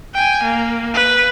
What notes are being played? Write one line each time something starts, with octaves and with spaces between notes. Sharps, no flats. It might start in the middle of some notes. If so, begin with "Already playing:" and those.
G5 G#5
A#3
B4